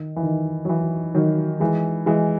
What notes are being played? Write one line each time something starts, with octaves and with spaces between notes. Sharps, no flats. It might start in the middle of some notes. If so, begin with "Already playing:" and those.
Already playing: D#3
E3
D#3
F#3
E3
D#3 F#3
E3 G#3
E3 G#3